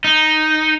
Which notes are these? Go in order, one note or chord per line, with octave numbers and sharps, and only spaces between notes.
D#4